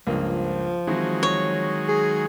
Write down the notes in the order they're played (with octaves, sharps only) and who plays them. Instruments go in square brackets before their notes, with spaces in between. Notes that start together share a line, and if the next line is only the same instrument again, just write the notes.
[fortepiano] C#2 G2 A#3 [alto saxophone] F3
[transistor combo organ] D#3 F#3 G#3 [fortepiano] E3 C4 E4
[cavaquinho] C#5
[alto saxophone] G#4